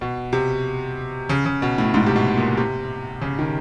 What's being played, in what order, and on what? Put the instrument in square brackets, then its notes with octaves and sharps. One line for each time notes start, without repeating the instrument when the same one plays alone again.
[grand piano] B2
C3
C#3
C#3
B2
A2
G#2
C3
B2
A#2
C3
C#3
D#3